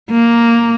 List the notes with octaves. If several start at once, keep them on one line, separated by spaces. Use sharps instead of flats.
A#3